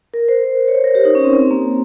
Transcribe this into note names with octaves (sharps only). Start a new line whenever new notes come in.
A#4
C5
A#4
C#5
C5
A#4
G4
D#4
C#4
C4
C4
A#3